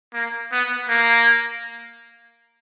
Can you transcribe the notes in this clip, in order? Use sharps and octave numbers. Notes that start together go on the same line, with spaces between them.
A#3
B3
A#3